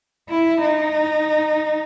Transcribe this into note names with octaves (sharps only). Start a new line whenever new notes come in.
E4
D#4